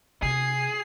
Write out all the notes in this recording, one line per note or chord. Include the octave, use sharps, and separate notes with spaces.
C3 G#4 C7